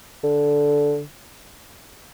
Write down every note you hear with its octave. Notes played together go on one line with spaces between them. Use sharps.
D3